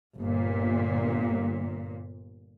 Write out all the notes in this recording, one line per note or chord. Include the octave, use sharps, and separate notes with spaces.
G1 A#2